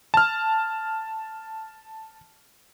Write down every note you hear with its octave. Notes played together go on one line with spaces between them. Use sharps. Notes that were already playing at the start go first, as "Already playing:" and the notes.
A5 F6